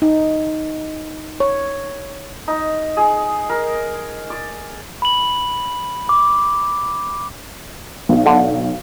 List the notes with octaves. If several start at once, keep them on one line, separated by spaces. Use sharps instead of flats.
D#4
C#5
D#4
G#4
A#4
D5
B5 F#7
D6
B1 D#4
D3